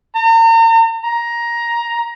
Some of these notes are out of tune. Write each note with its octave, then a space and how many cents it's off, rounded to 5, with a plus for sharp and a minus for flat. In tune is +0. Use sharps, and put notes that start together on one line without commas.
A#5 -40
A#5 +15